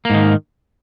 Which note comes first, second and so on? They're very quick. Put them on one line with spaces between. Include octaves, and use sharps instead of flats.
A#3 G#2 D#3